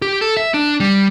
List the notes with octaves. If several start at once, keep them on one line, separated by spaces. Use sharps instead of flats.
G4
A4
E5
D4
G3